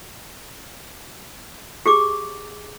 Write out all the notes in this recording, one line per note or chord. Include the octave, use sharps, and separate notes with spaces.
G4 G#4 D6